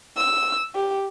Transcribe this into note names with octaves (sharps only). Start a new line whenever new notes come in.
E6
G4